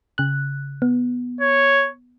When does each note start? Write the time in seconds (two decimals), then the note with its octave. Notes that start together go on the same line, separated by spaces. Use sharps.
0.18 C#3 F#6
0.82 B3
1.41 C#5